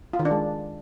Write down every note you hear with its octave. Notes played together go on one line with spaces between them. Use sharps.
F4
D#3
D4
G#3